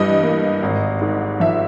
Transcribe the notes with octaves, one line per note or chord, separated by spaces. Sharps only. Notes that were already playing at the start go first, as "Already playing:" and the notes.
Already playing: G2 E3 G3 D#5
A#3
G#1
G#2
F3 E5